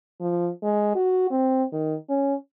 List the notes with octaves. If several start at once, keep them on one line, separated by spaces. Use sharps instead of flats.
F3
G#3
F#4
C4
D#3
C#4